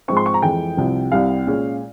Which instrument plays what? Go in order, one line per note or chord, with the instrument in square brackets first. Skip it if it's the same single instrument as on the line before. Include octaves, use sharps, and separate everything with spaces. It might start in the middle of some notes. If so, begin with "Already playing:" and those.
[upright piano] G#2 F3 C4 C#6
C6
C#6
A#5
F2 E3 G#3 G5
C2 C3 F3
C2 C3 G3 F5
A#2 G#3 C#4